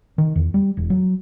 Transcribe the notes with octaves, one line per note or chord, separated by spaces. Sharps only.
D#3
E2
G3
E1
F#3